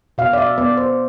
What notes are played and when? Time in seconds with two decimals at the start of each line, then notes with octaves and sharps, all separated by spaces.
0.18 B2 F5
0.33 D5
0.38 E5
0.58 B3 D5
0.77 C5